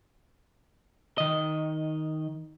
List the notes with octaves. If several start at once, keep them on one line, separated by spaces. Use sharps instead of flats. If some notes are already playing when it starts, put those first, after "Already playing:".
D#3 D#5